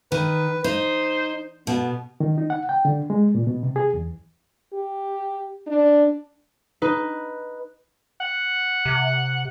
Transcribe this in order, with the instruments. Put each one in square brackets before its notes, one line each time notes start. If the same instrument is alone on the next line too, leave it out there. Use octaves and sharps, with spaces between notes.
[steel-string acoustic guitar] D#3 [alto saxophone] B4
[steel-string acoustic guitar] D#4 [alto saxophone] C5
[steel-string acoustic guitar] B2 [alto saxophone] B3
[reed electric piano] D#3
D#4
F#5
G5
D3
G#3
A#2
B2
C3
G#4
E2
[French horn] G4
D4
[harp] D#4 B4
[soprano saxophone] F#5
[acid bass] C3